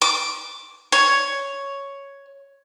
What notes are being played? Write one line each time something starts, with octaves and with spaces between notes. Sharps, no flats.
D6
C#5